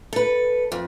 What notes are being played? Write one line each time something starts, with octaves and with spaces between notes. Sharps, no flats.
A4 B4
F2